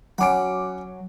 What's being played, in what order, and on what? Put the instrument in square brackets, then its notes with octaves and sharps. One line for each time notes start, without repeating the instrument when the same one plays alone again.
[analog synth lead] F#3 [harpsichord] C#4 B5 [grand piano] F#5 D6 D7